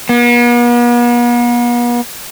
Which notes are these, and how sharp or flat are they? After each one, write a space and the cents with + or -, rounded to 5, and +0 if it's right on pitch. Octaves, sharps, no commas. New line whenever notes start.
B3 -45